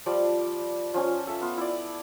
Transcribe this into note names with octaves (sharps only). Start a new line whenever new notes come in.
F3 G3 D5
F3 C#4 G#5
A4 E5
B3 F4
E4 D5